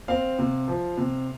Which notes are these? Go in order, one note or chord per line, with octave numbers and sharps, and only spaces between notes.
C4 F5
C3
F3
C3